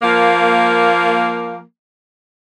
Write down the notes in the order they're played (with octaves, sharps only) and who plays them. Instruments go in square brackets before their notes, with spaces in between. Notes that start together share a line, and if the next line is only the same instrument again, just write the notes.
[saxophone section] F3 A#3